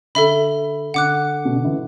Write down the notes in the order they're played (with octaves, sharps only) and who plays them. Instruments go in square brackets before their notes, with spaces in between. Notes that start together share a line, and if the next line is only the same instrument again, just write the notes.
[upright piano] D3 [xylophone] A4 E5 B5
[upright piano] D3 [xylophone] F#5 D6 F#6
[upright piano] B2
D3
E3